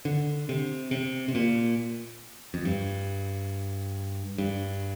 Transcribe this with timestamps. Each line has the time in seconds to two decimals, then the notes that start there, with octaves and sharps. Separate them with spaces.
0.05 D3
0.49 C3
0.91 C3
1.28 C3
1.35 A#2
2.54 F2
2.65 G2
4.38 G2